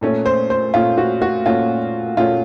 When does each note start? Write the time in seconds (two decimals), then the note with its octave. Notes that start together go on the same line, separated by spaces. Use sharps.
0.01 A#2 A3 C#4
0.26 C5
0.50 C5
0.74 A#2 A3 C#4 F4
0.98 F#4
1.22 F#4
1.45 A#2 A3 C#4 F4
2.17 A#2 A3 C#4 F4